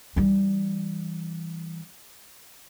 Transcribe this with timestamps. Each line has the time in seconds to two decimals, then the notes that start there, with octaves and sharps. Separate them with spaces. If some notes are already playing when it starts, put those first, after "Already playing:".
0.16 E3 G3